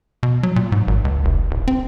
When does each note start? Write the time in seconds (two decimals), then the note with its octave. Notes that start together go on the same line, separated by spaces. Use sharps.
0.23 B2
0.43 F#3
0.56 A#2
0.72 G#2
0.87 G#1
1.05 C#2
1.25 F1
1.51 D1
1.68 C4